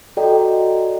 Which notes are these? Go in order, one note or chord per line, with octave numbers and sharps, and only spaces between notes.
F#4 A4 D5 D#5 G5 A#5